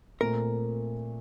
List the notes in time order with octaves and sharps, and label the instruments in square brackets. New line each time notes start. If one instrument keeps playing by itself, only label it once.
[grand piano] A#2 A3 C4 [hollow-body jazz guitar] A#4